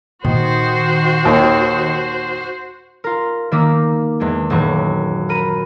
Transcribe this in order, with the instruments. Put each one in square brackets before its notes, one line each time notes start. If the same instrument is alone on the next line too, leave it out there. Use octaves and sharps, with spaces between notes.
[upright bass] A#2 D#4 [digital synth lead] D#3 [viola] F#4 C5
[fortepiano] D#2
[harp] F4 A#4
D#3 A#3 A#4 E5 D6
E2 G#3 D4
D#1 F#2 E3 C#6
A#4 B5 D#7